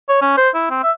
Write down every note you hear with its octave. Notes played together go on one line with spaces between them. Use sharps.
C#5
C#4
C5
E4
C4
E5